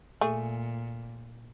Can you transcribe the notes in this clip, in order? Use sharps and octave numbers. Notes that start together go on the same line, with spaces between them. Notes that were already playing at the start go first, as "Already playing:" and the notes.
A#2 A3 G#4